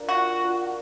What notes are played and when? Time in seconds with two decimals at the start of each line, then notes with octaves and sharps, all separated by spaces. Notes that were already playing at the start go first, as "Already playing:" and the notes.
Already playing: D4 F4 A#4 D5
0.09 F#4
0.43 D4 F4 A#4 D5